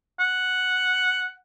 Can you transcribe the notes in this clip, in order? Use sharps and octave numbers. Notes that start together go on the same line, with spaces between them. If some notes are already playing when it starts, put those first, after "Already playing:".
F#5